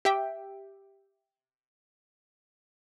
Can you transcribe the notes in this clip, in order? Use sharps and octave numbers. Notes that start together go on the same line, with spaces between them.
G4 E5 G5